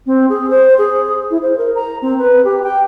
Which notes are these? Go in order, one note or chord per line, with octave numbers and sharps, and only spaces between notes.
C4
G#4
C5
G#4
E4
C5
A#4
A#5
C4
B4
G4
G5